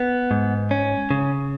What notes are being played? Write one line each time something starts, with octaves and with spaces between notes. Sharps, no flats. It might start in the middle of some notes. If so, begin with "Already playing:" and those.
Already playing: B3
G#2
C#4
C#3